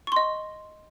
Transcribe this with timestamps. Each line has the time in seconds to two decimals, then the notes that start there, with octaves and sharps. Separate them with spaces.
0.07 C#6
0.12 C6
0.16 D#5